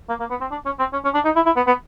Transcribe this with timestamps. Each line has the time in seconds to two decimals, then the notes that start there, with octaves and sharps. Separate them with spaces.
0.09 A#3
0.20 A#3
0.30 B3
0.41 C4
0.51 D4
0.65 C#4
0.79 C4
0.93 C#4
1.04 C#4
1.14 D4
1.25 D#4
1.36 E4
1.46 E4
1.56 B3
1.67 B3